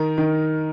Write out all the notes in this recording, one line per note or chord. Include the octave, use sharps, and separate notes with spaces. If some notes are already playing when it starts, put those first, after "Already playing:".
Already playing: D#3 A#4
D#3